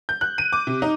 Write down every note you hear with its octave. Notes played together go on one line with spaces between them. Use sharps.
G6
F#6
D#7
D6
C3
D#4